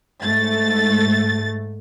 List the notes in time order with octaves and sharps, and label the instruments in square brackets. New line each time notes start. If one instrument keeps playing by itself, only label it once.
[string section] G#2 A3 A6